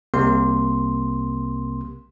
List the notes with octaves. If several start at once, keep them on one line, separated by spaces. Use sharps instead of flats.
C2 C3 A#3 C6